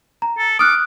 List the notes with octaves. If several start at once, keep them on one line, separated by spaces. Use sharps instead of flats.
A#5
A4
D6 D#6 F6 F#6